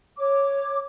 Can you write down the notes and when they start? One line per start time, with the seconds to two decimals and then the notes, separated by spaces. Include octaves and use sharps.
0.18 C#5 D6